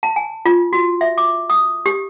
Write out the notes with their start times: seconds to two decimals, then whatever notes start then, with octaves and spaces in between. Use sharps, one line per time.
0.03 A5
0.16 G#5
0.45 F4
0.73 F#4
1.01 E5
1.18 D6
1.50 D#6
1.86 G4